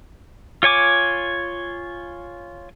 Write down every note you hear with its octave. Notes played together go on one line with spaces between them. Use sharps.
F4 C#5 G#5 D6